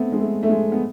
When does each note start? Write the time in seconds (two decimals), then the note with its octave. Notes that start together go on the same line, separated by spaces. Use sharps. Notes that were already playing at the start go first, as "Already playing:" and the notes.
Already playing: A3 B3 C4
0.12 G#3
0.19 A3
0.43 A3
0.49 G#3
0.72 B3